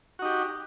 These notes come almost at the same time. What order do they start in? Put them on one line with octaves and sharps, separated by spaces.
F#4 D#4 G4